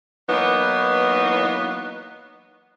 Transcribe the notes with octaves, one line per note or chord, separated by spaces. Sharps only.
E3 F#3 A#3 B3 D#4